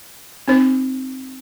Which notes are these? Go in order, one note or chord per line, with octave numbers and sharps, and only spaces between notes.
C4 D#4 C5